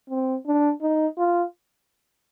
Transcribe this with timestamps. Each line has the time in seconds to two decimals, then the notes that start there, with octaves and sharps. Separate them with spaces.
0.10 C4
0.47 D4
0.82 D#4
1.18 F4